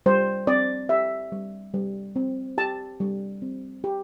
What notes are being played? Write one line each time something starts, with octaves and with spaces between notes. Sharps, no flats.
G3 C5
C4 D5
G4 E5
G3
G3
C4
G4 A5
G3
C4
G4